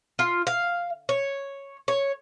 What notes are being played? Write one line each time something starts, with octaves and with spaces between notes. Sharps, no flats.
F4
F5
C#5
C#5